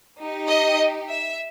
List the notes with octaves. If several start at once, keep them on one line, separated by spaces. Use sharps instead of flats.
D#4 G4
D#5
E5